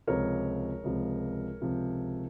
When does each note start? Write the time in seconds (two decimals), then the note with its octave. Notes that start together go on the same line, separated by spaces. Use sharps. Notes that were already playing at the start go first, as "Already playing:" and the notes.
0.07 C#2 C3 F3 A#4 C#5
0.84 C#2 C3 F3
1.61 C#2 C3 F3